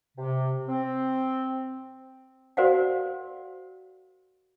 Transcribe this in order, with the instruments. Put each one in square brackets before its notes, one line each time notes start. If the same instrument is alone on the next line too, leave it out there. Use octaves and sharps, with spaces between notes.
[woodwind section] C3
C4
[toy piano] F#4 A#4 C5 D5 F5 F#5